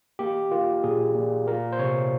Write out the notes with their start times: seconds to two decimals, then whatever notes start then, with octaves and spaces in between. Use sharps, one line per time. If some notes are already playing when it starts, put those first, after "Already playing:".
0.19 A#3 G4
0.51 A#3 F4
0.84 A#2 G#4
1.15 A#2
1.47 A#3 A#4
1.72 C5
1.79 C3 C#5